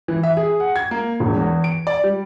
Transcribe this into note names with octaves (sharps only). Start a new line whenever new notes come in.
E3
E5
G#4
F#5
G#6
A#3
E1
E2
D7
D5
G3